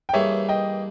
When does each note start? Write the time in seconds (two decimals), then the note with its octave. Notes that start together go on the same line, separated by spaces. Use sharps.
0.09 G5
0.13 G2 E3 A#3 D#4 G#4 C#5 E5
0.49 D#5 G5